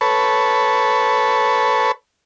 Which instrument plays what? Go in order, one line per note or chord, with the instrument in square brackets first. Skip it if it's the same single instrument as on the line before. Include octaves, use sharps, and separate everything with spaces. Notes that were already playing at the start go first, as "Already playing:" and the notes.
[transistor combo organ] A4 B4 C#5